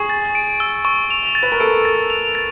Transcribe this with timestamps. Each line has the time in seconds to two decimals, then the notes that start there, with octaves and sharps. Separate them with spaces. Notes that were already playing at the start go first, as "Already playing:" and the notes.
Already playing: G#4 C#6
0.10 A6
0.35 D7
0.60 E6
0.85 C#6
1.10 F7
1.35 A6
1.43 B4
1.52 A#4
1.60 A4 D7
1.85 A6
2.10 F7
2.35 A6